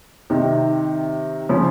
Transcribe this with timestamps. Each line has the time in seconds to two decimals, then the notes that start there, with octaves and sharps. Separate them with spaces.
0.30 C3 D#3
1.49 C#3 F3